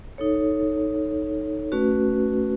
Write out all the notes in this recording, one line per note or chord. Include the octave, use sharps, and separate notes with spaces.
D#4 A4 C#5
A3 C#4 F#4 B4